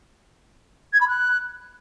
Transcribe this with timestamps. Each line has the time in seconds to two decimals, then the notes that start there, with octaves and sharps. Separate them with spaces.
0.93 G#6
1.00 B5
1.08 F#6